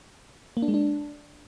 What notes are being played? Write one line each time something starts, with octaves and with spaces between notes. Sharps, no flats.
A#3
D4
G#3
D4